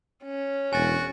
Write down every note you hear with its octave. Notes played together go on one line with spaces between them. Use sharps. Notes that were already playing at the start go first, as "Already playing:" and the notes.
C#4
E1 F#4 G#5 A6